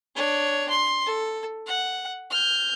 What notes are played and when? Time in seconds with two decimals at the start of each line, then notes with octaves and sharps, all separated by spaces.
0.16 D4 C#5
0.70 C6
1.06 A4
1.67 F#5
2.31 F6 G6